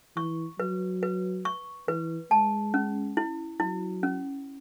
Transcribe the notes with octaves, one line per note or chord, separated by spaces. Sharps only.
E3 C#6
F#3 B4
B4
C#6
E3 B4
G#3 A5
C#4
E4
F#3 E4
C#4